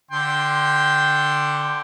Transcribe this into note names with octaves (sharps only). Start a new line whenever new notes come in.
D3 G5 C6